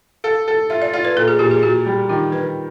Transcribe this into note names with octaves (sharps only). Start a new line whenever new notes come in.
A4 F5
A4
F4 E5
D5
F4 D5
B4
A#2 A4
G#4
A#2 G4
G#4
A#2 F#4
G3
D#3 F4
D#3 B4